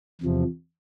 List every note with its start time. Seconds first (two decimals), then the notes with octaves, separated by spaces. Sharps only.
0.21 E2 C3 F3